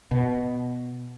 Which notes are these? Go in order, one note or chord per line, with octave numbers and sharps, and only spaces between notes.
B2